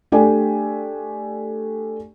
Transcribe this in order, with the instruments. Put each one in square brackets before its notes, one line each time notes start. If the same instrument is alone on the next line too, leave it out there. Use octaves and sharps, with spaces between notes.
[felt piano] A3 D4 G4 D5 G5 G#5